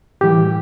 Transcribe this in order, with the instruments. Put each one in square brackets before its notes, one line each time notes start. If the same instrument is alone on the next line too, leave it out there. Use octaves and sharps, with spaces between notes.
[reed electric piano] A2 E3 G3 G4